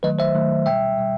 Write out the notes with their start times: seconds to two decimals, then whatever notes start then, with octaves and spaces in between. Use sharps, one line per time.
0.03 D#3 F#3 A3 B4 D#5
0.19 C5 E5
0.35 D#3 F#3 A3
0.66 B2 G3 E5 G5
0.97 B2 G3